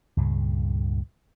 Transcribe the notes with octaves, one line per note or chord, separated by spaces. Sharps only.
C#2 G2 A#2 C#3